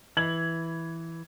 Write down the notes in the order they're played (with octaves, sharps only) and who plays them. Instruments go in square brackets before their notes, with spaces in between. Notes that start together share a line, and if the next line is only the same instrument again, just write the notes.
[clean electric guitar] E3 [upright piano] G#6 F#7